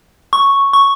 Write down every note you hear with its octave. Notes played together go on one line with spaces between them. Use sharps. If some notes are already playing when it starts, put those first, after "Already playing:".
C#6
C#6